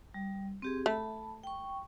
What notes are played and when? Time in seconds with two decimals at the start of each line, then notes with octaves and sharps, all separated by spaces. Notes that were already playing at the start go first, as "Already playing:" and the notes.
0.14 G3
0.62 C4 G4 G#4
0.86 A3 A5 B5
1.43 G5 C#6